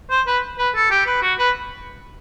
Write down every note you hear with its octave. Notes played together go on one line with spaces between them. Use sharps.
C5
B4
B4
A4
G4
B4
F#4
B4